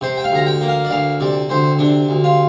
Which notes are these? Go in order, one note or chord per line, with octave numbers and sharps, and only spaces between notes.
C3 C5
G5
F5
D2 A#5
G5
A#3
F5
D5
D2 F5
C3 D5
D2 C5
C3 D4
D2
F4